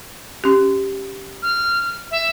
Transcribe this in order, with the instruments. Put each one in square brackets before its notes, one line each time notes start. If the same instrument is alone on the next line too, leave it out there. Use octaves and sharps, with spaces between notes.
[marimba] C#4 G4
[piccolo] F6
E5